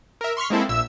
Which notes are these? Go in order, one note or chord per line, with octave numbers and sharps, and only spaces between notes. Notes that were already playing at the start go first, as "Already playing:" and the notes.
A#4 E5
C6 C#6 F6 B6
G#3 A#3 C4 E4 A4
A#1 A#2 E5 E6